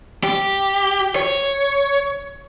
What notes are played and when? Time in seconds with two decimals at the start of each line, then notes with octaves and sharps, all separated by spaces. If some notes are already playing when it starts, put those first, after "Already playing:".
0.24 G4
1.16 C#5